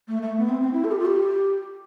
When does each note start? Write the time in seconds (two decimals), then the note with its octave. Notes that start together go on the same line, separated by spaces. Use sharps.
0.08 A3
0.22 A3
0.38 B3
0.49 C4
0.61 C4
0.73 E4
0.84 A4
0.91 G4
0.99 F4
1.06 G4